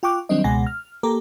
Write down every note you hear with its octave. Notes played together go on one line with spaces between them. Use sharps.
F4 G5 C#6 D6 F#6
D#3 F#3 G3 C4 D4 D#5
C#2 B2 G#3 F#5 G#5 A#6
F6
A#3 G4 A4 A#5 D6